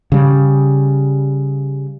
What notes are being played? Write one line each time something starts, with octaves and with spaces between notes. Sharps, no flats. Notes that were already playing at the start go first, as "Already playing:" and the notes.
C#3 G3